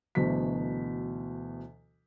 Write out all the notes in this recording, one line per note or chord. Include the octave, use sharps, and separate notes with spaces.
D2 B2 E3 F#3 B6